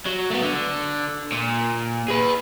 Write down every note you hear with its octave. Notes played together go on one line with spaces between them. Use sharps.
F#3
A3 B3
D3
A#2
G#4 B4